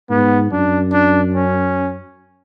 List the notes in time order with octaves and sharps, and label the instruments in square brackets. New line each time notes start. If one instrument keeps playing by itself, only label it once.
[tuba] G#2 [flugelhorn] B3
[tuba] F#2 [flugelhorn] D4
[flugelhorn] D4
C#4